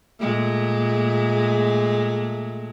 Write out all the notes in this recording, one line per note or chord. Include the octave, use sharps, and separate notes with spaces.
A#2 G#3 A3